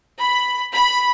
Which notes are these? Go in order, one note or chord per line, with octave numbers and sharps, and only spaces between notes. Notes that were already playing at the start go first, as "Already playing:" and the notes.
B5
B5